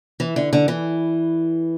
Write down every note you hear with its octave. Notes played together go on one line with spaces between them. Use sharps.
E3
D3
D3
E3